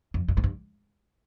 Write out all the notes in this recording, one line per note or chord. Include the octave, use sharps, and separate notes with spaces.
F2
G2
G#2
G2